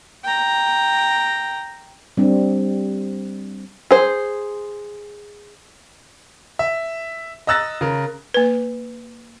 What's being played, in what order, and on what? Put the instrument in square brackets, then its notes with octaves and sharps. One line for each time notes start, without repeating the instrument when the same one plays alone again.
[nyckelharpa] G5 A#5
[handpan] G3 C4 D4
[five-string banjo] G#4 C5
[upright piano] E5
D#5 A#5 E6 F#6 A6 A#6
C#3 A#4
[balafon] A#3 B4